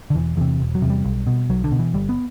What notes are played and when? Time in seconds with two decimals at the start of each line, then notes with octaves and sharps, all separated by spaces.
0.10 D3
0.14 E1 E3
0.37 E2 C3 E3
0.60 E1
0.75 F#3
0.82 E2 C3
0.90 G3
1.05 B1
1.27 B2
1.49 B1 F#3
1.64 D3
1.72 B2
1.79 E3
1.94 G1 G3
2.09 B3